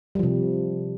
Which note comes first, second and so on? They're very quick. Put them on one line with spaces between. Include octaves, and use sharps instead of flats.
G3 F3 C3